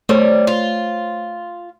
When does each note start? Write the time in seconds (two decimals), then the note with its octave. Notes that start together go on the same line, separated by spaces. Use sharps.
0.09 G3 A3 C5 C#5
0.47 F4